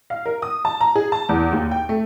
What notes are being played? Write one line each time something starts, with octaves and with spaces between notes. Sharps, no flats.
F5
A#4
D#6
A5
A#5
G#4
A5
E2
D#2
G5
A3